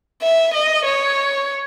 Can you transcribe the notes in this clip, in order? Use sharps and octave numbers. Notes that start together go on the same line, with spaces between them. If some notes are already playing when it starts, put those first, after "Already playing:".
E5
D#5
C#5